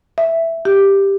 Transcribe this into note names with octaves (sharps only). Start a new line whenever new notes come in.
E5
G4